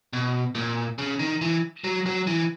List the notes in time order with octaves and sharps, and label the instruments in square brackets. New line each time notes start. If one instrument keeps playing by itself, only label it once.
[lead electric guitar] B2
A#2
C#3
D#3
E3
F#3
F#3
E3